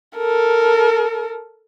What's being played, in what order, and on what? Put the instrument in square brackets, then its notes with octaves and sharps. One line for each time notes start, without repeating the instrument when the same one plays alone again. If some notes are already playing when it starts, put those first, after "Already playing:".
[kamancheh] A4 A#4